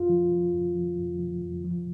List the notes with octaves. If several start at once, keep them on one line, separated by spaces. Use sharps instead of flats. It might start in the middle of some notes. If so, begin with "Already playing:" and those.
Already playing: F2 F4
F3
F3
F2
F3
F2
F3
F2
F3